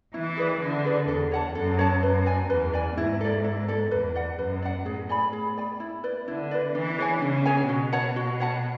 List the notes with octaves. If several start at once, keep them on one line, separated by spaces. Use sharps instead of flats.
E3 E4
G#4 B4 D5
D3 E4
G#4 B4 D5
E2 A4
C#5 F#5 A5
F#2 A4
C#5 F#5 A5
F#2 B4
D5 G#5
E2 B4
D5 G#5
G#2 E4
A4 D5
E4
A4 D5
E2 B4
D5 F#5
F#2 B4
D5 F#5
A2 G#4
D5 G#5 B5
G#4
D5 G#5 B5
E4
B4 D5
D3 E4
B4 D5
E3 D4
G#4 C#5 G#5
C#3 D4
G#4 C#5 G#5
B2 F#4
C#5 F#5 A5
F#4
C#5 F#5 A5